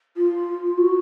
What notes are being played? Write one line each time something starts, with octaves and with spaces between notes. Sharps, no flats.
F4
F#4